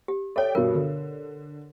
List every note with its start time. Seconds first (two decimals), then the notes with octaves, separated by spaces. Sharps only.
0.08 G4
0.36 A4 C#5 D5 E5 G5
0.55 G2 B2 A#4
0.74 D3